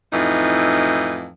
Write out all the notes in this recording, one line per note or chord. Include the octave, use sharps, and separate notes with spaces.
F2 A2 E3 D#4